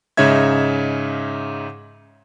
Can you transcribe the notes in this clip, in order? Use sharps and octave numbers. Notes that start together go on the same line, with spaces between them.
G#2 C#3 D#4 C#5 E5 G#6